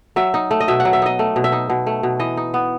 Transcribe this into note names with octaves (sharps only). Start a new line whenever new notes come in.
F#3 E5
D#4
A3
D#5
B2 E5
F#5
F#3
E5
D#4 D#5
A3
B2
E5
D#4
B2
A3
B2
E3 D#5
D#4
B3